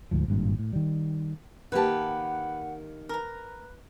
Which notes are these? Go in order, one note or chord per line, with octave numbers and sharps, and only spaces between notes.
D2 G#2 F3
G#1 G2 A#2
A2
D#3 G3
D#3 A#3 G4 B4 F#5 A5
A#4 B4 A#5